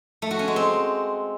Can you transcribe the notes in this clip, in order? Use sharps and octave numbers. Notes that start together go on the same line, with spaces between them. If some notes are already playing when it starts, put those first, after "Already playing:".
A3
F#4
C#4
G#3
C4